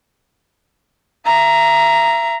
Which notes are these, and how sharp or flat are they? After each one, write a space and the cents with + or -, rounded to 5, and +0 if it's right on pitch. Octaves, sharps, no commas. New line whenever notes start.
E5 +35 A#5 +0